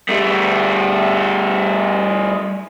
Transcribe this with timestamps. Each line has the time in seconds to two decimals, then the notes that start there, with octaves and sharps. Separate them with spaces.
0.09 G3 A3